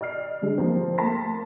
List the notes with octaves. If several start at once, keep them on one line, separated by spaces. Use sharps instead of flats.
D5 D#5 F6 C7
C2 D3 G#3
F3 A#3 C4
A3 A#3 A5 C6 A#6 B6